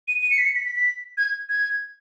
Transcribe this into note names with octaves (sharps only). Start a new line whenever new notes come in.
D#7
D#7
C#7
B6
C#7
B6
B6
B6
G#6
G#6